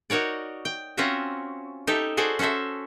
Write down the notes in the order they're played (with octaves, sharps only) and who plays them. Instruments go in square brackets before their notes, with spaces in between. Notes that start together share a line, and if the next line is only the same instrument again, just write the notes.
[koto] D#4 F#4 A#4 C#5 D5
G5
C4 C#4 F4 F#4 E5 A#5
D#4 G4 A4 E5
F#4 G#4 A4 C5 D5
C#4 F#4 A4 C5 E5